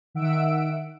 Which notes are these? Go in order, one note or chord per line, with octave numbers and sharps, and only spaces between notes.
D#3 E5 F#5 E6 D7